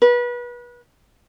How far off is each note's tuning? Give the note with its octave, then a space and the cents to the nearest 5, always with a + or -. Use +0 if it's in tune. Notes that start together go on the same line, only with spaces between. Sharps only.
B4 -30